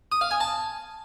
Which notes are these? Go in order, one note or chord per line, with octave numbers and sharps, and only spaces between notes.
D#6
F5
G#5
A5